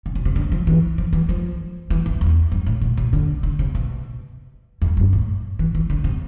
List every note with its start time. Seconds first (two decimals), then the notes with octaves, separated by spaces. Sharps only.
0.06 C3
0.15 B2
0.25 C3
0.36 D3
0.52 F3
0.67 E3
0.98 F3
1.13 E3
1.29 F3
1.90 E3
2.06 F2
2.21 E2
2.52 G2
2.67 A2
2.82 B2
2.97 B2
3.13 D3
3.43 D3
3.59 C3
3.75 B2
4.82 F2
4.97 G2
5.13 A2
5.59 E3
5.75 E3
5.90 D3
6.04 C3